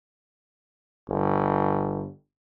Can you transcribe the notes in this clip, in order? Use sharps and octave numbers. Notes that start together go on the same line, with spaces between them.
G1